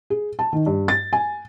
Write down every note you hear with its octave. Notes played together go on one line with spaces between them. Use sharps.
G#4
A5
D#3
G2
A6
G#5